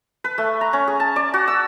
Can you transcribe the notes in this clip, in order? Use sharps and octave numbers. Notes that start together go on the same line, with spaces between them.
B4
A3
A#5
C#4
G#4
A5
D5
F#4
E6